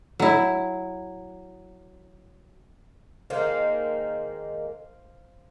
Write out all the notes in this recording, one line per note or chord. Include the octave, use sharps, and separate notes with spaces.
F#3 E4
D#3 G#3 A#3 C5 F5